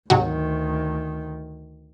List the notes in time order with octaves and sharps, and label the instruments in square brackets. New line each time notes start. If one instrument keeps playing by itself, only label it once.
[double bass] D2 D#3 [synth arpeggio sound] G#2 C3 F#3